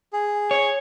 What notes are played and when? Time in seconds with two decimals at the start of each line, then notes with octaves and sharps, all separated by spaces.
0.13 G#4
0.51 C#5